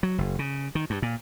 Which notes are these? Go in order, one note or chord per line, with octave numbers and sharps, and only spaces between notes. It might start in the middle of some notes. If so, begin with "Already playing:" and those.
F#3
F#1
C#3
D#3
G2
A#2